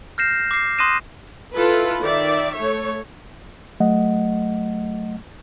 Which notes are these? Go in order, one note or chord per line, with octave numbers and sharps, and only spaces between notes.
F6 G6 A#6 C7 E7
D6 C7
C6 D#6 F#6 A#6 D#7 E7
E4 F4 A4 B4
D#3 D5 E5
A3 C#5
F#3 A3 D#5 F#5